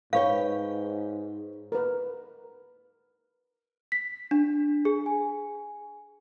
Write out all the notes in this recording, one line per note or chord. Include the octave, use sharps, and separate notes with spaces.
G#2 B4 C#5 F5 G5
A#4 B4
B6
D4
G#4
G#5